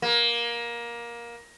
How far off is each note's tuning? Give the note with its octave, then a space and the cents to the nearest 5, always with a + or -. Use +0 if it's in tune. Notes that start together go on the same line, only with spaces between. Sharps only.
A#3 +20